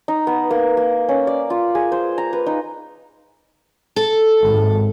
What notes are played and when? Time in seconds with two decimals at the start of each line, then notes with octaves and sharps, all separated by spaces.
0.08 D#4
0.27 B3
0.51 A#3
0.77 A#3
1.09 C#4
1.27 D5
1.50 F4
1.75 G#4
1.92 C5
2.18 A#5
2.33 B4
2.46 D#4
3.96 A4
4.43 G#1